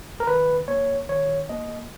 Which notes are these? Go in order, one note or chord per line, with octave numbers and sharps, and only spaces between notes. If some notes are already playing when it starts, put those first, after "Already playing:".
A#4
D#3 B4
A#3 C#5
D#3 C#5
A#3 D#5